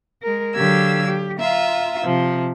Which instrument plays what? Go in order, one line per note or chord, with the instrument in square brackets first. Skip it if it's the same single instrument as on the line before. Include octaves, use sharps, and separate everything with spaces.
[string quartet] G#3 A#4
D3 F#3 G4 F5 E6 G#6
G4
F4 E5 A#5
C3 F3